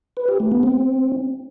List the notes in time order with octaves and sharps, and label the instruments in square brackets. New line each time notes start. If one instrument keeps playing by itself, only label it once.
[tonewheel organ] B4
G4
A3
B3
C4